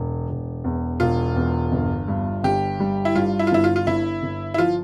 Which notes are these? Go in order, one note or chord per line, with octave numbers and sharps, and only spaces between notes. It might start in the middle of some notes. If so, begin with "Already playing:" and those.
Already playing: E1
E1
E2
E1 F4
E2
G1
G2
G1 G4
G3
E4
G2 F4
E4
F4
G1 E4
F4
F4
G1 E4
G1
E4
F3 F4